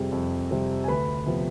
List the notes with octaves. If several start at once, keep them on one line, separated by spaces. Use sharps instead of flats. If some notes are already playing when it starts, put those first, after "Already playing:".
Already playing: F2 C3 G3 C4 G#4
F2
C3 G3 C4
G#5
D2 B4 B5
C3 F3 B3